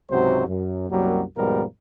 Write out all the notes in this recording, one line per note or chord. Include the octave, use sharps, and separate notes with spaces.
C#2 G#2 C3 F#3 F#4 C5
F#2
C2 F#2 F#3 G3 A#3
D#2 G#2 B2 F3 G3 A#4